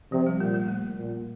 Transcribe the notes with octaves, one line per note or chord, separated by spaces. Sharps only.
C3 F3
G3
A#2 A3
A3
A#3
A#2